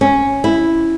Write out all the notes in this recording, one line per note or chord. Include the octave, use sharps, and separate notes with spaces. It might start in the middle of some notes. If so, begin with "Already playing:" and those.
C#4
E4